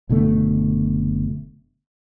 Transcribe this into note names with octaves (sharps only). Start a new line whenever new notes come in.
F#1 B2 D3 A3